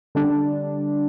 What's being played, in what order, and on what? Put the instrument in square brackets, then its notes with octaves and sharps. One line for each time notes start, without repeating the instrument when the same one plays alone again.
[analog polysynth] D3 G3 D4